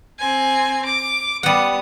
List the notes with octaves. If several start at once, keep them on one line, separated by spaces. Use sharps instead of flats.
C4 G#5
D6
G3 B3 F#5 D#6